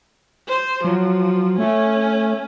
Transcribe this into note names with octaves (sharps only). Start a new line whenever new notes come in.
C5
F3 F#3
A3 C#4